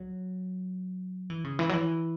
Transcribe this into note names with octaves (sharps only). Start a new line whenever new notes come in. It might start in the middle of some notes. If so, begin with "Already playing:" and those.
Already playing: F#3
E3
C#3
E3
F#3
E3